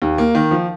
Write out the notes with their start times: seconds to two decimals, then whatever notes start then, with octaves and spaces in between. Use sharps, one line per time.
0.02 D#2
0.18 A#3
0.35 D#3
0.51 F3